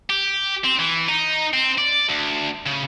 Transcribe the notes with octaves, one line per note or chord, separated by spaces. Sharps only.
G4
C4
E3
D#4
C4
D5
D2
C#3